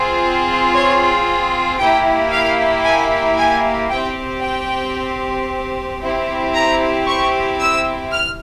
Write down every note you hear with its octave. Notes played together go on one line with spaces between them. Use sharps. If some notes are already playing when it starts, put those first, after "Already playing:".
Already playing: C4 F4 G#4
C#5
A#3 E4 G4 G5
F5
G#5
G#5
C4 G4 G5
G5
C4 E4 G4
A#5
C#6
E6
F6